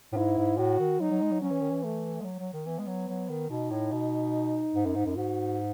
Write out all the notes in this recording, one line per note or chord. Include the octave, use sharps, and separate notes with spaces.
A2
G#2 E4
G#2
A2 F#4
D#3
F#3 D#4
F#3
G#3
F#3
F#3 C#4
E3
D#3
E3
A3
G#3
F#3
F#3
D#3
E3 B3
G#3
F#3
F#3
D#3
B2 D#4
A2
B2
G#2
F#2
G#2
F#2
G#2 F#4